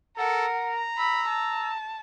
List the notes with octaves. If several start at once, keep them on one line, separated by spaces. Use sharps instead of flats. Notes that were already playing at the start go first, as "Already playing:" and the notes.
A4 A#4 F#5
A#5
B5 E6
A5